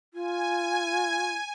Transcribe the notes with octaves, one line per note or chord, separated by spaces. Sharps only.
F4 G#5